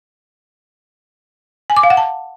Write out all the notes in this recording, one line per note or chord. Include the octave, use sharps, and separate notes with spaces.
G#5
D6
F5
F#5
A5